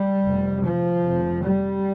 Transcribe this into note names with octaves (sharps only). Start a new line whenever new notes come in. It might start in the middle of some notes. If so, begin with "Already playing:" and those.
Already playing: G3
F1 F2 C3
F3
F1 F2 C3
G3